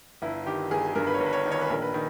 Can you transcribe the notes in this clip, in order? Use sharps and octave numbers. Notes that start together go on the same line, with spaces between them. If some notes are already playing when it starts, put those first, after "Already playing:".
G1 E4
D#3 G4
G1 G#4
G#4
G2 A#4
B4
C#5
G1
B4
C#5
D#3
C#5
B4
A#1 A#4
B4
D#3